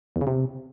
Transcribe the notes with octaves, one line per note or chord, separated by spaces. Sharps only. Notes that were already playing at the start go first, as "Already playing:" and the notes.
E2
C#3
C3